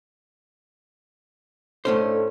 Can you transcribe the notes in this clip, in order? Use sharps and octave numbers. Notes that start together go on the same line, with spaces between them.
A2 A3 C#4 D4 A4 C5